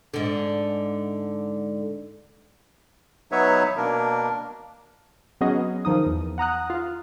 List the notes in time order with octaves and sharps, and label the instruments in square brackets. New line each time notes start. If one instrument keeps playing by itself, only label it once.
[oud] G#2 D3
[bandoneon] F#3 B3 D#4 B4 C#5 E5
B2 A#3 D4 A#4
[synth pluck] F#3 B3 C#4 F#4 G#4 D#5
D#3 F3 D#4 D#6
E2
F#5 A#5 D#6 F#6
F4